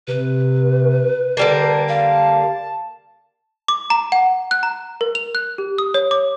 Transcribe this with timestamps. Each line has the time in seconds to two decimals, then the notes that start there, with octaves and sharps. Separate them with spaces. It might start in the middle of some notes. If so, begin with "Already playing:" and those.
0.08 C3 B4
1.37 D3 G3 A#3 A5
1.89 F5
3.68 D6
3.90 A#5
4.12 F#5
4.51 F#6
4.63 A#5
5.01 A#4
5.15 F7
5.35 F#6
5.58 G4
5.78 D#6
5.94 C#5
6.11 D6